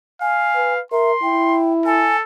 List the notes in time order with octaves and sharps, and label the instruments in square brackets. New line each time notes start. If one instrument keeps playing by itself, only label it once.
[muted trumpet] F5 [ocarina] G#5
[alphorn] B4
[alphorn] A#4 [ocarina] E5 [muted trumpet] C6
[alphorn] E4 [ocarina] G5
[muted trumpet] A4 [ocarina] G#5